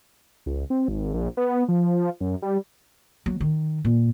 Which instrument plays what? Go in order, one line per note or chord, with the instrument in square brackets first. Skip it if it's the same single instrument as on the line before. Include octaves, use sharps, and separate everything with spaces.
[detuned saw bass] C#2
C4
G#1
A#1
B3
F3
F#2
G3
[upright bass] F#3
D#3
A#2